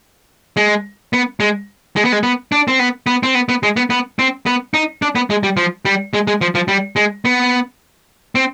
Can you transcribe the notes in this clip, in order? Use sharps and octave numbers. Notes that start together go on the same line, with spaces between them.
G#3
B3
G#3
G#3
B3
G#3
B3
D4
C4
B3
B3
C4
B3
B3
G#3
B3
B3
C4
B3
D#4
D4
B3
G#3
G3
F3
G3
G#3
G#3
F3
F3
G3
G#3
B3
C4